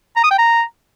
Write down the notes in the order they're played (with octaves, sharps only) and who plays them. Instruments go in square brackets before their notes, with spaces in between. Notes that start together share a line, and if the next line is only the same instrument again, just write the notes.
[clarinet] A#5
D#6
G5
A#5